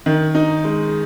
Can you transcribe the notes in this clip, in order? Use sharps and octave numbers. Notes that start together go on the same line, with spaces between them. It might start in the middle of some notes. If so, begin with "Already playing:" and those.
D#3
D#4
G#3